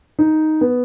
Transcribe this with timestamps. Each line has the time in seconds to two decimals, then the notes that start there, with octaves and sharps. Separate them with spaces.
0.19 D#4
0.61 B3